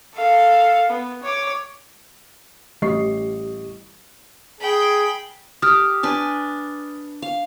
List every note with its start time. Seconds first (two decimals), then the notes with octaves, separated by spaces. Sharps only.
0.15 A4 F5
0.90 B3
1.23 C#5 D6
2.82 A1 G3 D#5 C#6 C7
4.60 G#4 G5 B5
5.62 G4 D#6 F6
6.03 D4 B4 G#5
7.22 F5